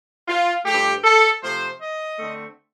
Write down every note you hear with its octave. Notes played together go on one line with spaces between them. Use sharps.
F4
G2 F3 A3 G4
A4
C3 F3 A3 C5
D#5
D3 A3 C4